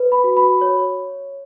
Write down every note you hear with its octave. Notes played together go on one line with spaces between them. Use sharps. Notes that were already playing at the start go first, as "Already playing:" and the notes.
Already playing: B4
B5
F#4
B5
C#5